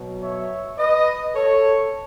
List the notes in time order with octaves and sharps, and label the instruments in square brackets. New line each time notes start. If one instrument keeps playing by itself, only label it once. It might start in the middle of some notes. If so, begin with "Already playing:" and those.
Already playing: [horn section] B2 F#3
C#5 E5
B4 D#5
A4 C#5